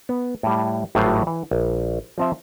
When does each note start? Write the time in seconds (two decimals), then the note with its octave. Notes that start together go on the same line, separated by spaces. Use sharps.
0.09 B3
0.43 A2 G3
0.95 G#1 A2 F#3 G3 F4 C5
1.27 E3
1.51 A#1
2.18 F3 C4 E5